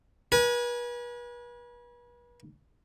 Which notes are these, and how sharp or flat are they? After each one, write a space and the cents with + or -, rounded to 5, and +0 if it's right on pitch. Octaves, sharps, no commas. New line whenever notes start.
B4 -40 G#5 +0